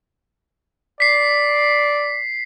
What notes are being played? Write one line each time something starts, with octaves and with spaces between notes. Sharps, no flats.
D5 B6 C7